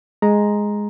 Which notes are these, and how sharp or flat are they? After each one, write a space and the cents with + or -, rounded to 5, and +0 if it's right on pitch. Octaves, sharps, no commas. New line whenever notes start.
G#3 +0 A#5 +0